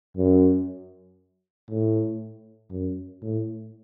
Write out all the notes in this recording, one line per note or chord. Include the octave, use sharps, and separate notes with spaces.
F#2
A2
F#2
A2